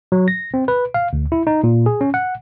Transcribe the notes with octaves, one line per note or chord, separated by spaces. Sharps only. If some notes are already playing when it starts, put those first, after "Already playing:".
F#3
A#6
C4
B4
F5
D2
E4
D#4
A#2
G#4
C#4
F#5